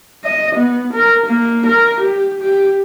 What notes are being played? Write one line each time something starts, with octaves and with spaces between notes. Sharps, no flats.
D#5
B3
A#4
A#3
A#4
G4
G4